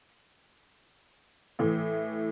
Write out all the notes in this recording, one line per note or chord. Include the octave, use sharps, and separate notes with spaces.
A2 E3